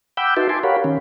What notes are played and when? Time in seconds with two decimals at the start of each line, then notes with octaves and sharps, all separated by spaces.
0.17 F#5 G5 B5 D6 E6 G6
0.37 D#4 F#4 B4 E5 A5 C6
0.49 G#5 A5 C6 D6
0.63 G4 A#4 C#5 F5 F#5 B5
0.84 D#3 C#4